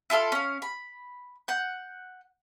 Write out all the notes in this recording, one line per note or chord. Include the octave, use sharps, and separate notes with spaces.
E4 F4 A4 F6
C#4 F5
B5
F#5 G6